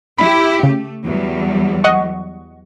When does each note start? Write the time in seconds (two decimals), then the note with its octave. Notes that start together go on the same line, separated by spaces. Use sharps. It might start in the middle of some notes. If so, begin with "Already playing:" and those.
0.18 E4 G4 B5
0.63 C#3 A3
1.04 E2 F#3 G3
1.84 D#5 F#5 C#6